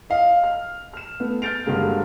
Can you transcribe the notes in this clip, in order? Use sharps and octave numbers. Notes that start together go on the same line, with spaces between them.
D#5 F5
F6
F6 E7
A3 B3
F6 G6 A6 D7 F7
G2 D3 F#3 G#3 A#3